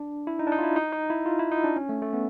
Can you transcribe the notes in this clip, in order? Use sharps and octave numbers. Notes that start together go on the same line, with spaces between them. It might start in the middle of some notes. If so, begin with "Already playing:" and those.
Already playing: D4
E4
D#4
D4
D#4
F4
E4
D#4
D#4
E4
F4
E4
D#4
D4
C#4
A3
A3
B3